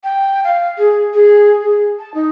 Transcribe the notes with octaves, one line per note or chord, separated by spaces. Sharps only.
G5
F5
G#4
G#4
G#4
A5
D#4